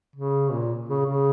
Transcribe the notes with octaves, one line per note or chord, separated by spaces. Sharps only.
C#3
A#2
C#3
C#3